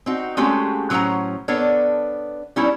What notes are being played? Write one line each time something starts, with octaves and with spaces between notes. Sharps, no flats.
C4 D#4 F#4
G#3 A3 C4 C#4 F#4 G4
A2 F#3 C#4 C5 F#5 A#5
B3 D4 A4 A#4 C#5
G3 B3 C#4 D#4 E4